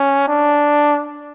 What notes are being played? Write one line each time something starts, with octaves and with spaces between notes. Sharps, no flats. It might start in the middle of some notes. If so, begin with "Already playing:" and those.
Already playing: C#4
D4